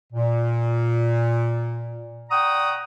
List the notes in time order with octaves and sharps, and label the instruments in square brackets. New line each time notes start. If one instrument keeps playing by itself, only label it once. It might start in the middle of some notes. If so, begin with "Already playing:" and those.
[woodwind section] A#2
D5 F#5 G5 A#5 C#6 D#6